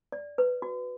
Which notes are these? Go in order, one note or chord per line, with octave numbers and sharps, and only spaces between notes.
D5
B4
F#4